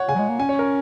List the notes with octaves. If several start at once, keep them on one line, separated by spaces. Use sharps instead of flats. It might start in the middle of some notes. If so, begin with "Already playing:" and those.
Already playing: C#5 F#5
C#3 G#5
F#3
G#3
A#3
C#4 G#5
C#5
A#4